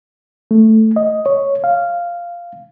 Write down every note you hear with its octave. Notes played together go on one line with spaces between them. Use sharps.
A3
D#5
C#5
F5